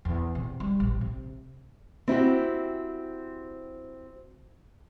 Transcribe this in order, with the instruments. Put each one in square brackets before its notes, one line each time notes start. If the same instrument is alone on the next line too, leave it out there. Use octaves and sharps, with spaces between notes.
[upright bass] E2
C3
G3
A1
C3
[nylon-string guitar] C4 E4 F#4 G4